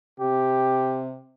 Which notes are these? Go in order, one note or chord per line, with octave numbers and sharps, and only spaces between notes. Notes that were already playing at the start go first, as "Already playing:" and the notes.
C3 G4